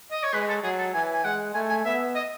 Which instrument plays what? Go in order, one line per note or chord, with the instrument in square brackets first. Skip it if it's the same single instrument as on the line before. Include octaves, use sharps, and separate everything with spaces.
[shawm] D#5
C#5
[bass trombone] G#3 [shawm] B4
[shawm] A4
[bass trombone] F#3 [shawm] G#4
[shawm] A4
[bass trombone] E3 [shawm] G#5
[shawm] G#5
[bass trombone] G#3 [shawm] F#5
[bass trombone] A3 [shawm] G#5
[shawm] G#5
[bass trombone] B3 [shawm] E5
[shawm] D#5